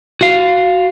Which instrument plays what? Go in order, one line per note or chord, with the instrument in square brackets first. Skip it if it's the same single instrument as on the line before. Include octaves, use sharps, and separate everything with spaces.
[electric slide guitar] F#4 F5